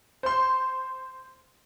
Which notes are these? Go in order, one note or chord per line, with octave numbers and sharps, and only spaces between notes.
C5 C6